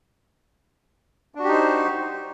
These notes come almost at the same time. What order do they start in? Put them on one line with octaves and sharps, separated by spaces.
D4 F#4 G4 D#4 C5